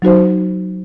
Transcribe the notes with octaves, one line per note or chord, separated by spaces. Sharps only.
F#3 D#4 F#4 C5